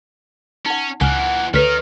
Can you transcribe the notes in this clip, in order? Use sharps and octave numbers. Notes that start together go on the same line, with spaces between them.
C#4 D#4 F#5
C#2 A#2 E3 F#5 G#5 F6
D2 D#3 D#4 A4 B4 C#5 F6 B6